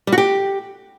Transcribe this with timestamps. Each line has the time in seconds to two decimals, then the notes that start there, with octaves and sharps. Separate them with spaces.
0.07 G3
0.12 F#4
0.18 G4